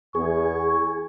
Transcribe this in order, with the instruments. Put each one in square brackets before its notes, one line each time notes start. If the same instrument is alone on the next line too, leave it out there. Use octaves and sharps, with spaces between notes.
[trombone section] E2 [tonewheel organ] G#4 [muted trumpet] C#6